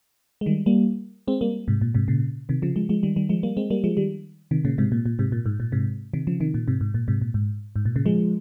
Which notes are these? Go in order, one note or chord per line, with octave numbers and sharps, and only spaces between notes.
G#3
D#3 G3
G3 A#3
G#3 C4
G3 A#3
G#2 C3
A#2
G#2 C3
A#2 C#3
C3 D#3
C#3 F3
F3 G#3
F3 G#3
D#3 G3
D#3 G3
F3 G#3
G3 A#3
G#3 C4
G3 A#3
F3 G#3
D#3 G3
C3 D#3
A#2 C#3
G#2 C3
A#2
A#2
G#2 C3
A#2
G#2
A#2
G#2 C3
C3 D#3
C#3 F3
C3 D#3
A#2
G#2 C3
G#2
A#2
G#2 C3
A#2
G#2
G#2
A#2
A#2 C#3
F3 G#3